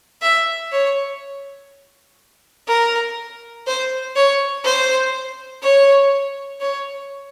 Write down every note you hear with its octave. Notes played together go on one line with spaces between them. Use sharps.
E5
C#5
A#4
C5
C#5
C5
C#5
C#5